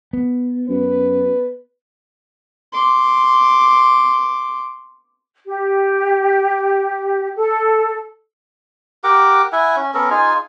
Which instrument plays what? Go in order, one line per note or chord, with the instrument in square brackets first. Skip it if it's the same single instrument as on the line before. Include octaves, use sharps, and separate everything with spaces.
[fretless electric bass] B3
[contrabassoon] F#2 [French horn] B4
[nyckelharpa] C6 D6
[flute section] G4
A4
[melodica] G4 A#4 F#5 D6
E4 E5 F#5 G#5
C#4
B3 C#4 A4 A#4
D#4 F4 G#4 G#5